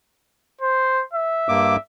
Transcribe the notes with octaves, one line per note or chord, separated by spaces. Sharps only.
C5
E5
G2 A#3 D6